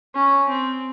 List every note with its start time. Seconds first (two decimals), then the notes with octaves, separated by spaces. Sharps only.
0.15 C#4
0.49 C4